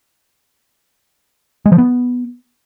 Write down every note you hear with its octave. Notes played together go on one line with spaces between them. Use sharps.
G#3
F3
B3